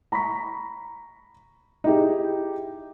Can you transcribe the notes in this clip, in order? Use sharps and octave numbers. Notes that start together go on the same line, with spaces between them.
A#5 B5 C#6 B6
D#4 E4 G4 G#4